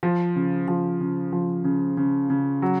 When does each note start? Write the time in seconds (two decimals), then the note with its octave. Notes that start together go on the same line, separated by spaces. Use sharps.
0.03 F3
0.36 C#3
0.68 F3
1.00 C#3
1.33 F3
1.64 C#3
1.97 C#3
2.30 C#3
2.62 F#3